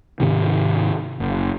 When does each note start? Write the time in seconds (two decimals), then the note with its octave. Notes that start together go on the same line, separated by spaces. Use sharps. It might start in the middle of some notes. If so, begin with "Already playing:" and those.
0.20 G#2 C3 D#3
1.20 F#1